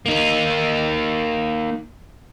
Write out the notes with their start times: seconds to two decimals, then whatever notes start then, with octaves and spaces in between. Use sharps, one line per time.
0.06 A#3 D#4